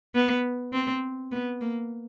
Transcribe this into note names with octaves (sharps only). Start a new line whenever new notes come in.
B3
C4
B3
A#3